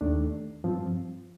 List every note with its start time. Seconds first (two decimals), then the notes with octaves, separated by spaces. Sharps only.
0.01 D#2 D#3 A3 D4
0.64 G2 F3 C4